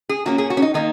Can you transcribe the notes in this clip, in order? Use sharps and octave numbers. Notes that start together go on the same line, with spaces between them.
G#4
A#2 A#3 C#4 F#4
G#4
F#4
C#4
D#4
D#3 A#3 D#4